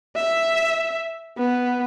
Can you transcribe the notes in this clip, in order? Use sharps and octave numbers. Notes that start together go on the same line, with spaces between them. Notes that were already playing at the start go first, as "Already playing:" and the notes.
E5
B3